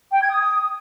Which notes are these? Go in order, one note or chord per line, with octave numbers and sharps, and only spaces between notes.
G5
G#6
D#6